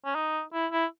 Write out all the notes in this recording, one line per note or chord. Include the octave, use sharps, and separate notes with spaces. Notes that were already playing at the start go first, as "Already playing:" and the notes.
C#4
D#4
E4
E4